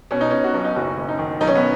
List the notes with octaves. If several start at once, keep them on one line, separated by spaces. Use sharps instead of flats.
B2 C#4
D#4
B2 C#4
F#4
B1
D#4
F#1 F#4
F#1
D#4
D#3
B1 D#4
C#4
B3